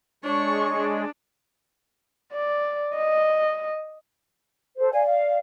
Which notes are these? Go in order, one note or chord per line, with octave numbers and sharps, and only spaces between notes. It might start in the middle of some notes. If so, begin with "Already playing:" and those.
G#3 D4 C#5 C#6
D4
D5
D#5
A4 C5
D5 F5 G#5
F5